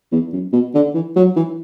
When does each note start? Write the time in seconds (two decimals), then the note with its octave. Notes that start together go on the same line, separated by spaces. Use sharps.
0.12 E2
0.33 F#2
0.53 B2
0.75 D3
0.94 E3
1.16 F#3
1.36 E3